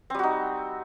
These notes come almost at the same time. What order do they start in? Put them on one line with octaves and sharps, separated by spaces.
C4 G3 F#4 D#4